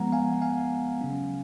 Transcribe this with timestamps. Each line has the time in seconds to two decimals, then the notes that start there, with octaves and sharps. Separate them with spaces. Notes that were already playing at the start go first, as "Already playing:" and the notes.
Already playing: F3 G#3 B3 F#5 A#5
0.12 F5 G#5
0.32 F#5
0.42 F5 G#5
1.01 C#3 F#3 C#4